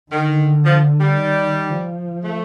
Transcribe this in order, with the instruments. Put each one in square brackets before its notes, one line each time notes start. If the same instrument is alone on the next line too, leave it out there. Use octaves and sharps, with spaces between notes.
[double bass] D3 [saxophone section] D#3
[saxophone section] F3
G3
[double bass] D#3
F3
[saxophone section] A3